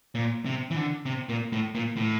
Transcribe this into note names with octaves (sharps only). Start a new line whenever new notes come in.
A#2
C3
E3
D3
C3
A#2
A2
A#2
A2